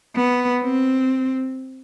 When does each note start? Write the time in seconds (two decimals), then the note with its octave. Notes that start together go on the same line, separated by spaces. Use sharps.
0.15 B3
0.62 C4